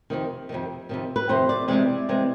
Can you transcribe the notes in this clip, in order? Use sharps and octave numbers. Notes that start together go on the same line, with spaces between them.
F2 C3 D#3
F2 C3 D#3
F2 C3 D#3
B4
F2 C3 D#3 C5
D5
C3 E3 G#3 C4 D5
C3 E3 G#3 C4